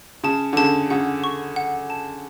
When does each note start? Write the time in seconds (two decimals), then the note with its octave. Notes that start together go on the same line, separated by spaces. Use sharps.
0.24 C#3 A5
0.53 D3
0.57 C#3 A5
0.90 C#3 F#5
1.24 C#6
1.56 F#5
1.90 A5